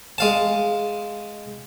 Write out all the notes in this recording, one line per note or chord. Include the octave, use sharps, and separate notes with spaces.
G#3 F5 A5